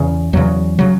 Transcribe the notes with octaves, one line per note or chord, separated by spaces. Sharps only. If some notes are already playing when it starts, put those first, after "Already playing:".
Already playing: E2 C#3
E2 C#3 F#3
C#3 F#3